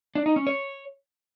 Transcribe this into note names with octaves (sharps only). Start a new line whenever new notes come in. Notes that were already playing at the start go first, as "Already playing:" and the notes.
D4
D#4
C#4
C#5